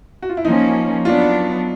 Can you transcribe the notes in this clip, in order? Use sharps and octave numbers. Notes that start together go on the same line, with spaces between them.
F#4
F4
E4
F3 A#3 C#4 D#4
F#3 B3 D4 F4